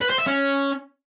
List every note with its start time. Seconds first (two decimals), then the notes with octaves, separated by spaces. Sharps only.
0.01 B4
0.10 C5
0.18 E5
0.26 C#4